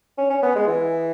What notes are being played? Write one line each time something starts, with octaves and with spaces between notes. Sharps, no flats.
C#4
C#4
B3
G#3
E3